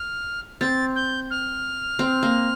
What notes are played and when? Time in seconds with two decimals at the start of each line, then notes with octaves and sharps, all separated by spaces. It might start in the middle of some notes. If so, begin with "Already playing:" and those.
Already playing: F6
0.61 C4 A6
0.96 G6
1.30 F6
1.99 C4
2.23 A#3